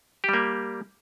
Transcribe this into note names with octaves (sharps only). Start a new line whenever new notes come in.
G3 A#3 G4